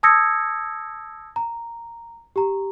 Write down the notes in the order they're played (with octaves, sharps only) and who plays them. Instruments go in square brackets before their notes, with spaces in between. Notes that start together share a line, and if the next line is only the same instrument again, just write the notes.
[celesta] A5 D#6 E6 G#6 A#6 C#7
A#5
G4 A#5